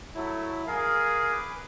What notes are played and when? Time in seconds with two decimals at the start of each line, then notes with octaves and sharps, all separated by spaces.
0.15 F#3 A3 E4
0.67 G#4 A#4 F5
1.32 B4 D6